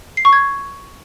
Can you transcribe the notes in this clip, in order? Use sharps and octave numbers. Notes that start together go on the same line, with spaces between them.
C7
C#6
G#6